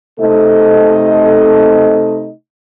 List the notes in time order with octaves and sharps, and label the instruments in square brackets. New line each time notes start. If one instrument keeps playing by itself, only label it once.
[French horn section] C3 A3 C4 D#4 A4 D#5